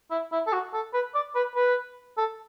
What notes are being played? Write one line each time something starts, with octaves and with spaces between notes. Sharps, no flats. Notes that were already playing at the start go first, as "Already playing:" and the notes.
E4
E4
A4
F#4
A4
B4
D5
B4
B4
A4